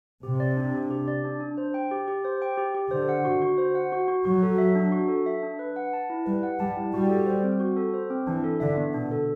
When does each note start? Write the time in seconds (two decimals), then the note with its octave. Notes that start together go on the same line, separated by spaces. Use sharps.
0.23 C3 G4
0.40 D5
0.57 D4
0.74 D4
0.91 G4
1.08 D5
1.25 D4
1.40 D4
1.58 C5
1.74 G5
1.91 G4
2.08 G4
2.25 C5
2.42 G5
2.57 G4
2.75 G4
2.91 D3 C5
3.09 F#5
3.25 F#4
3.42 F#4
3.58 C5
3.75 F#5
3.92 F#4
4.08 F#4
4.25 F#3 F#4
4.43 A4
4.58 E5
4.75 D4
4.92 F#4
5.08 A4
5.26 E5
5.43 D4
5.59 B4
5.76 F#5
5.93 A5
6.10 E4
6.26 G3 B4
6.43 F#5
6.60 G3 A5
6.77 E4
6.93 G3 F#4
7.09 A4
7.26 C5
7.44 C4
7.60 F#4
7.76 A4
7.94 C5
8.10 C4
8.27 E3 D4
8.44 A4
8.60 D3 E5
8.77 B3
8.94 B2 D4
9.12 A4